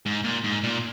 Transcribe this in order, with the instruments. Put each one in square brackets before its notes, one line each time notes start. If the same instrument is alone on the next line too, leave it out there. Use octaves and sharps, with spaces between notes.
[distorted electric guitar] G#2
A#2
G#2
A#2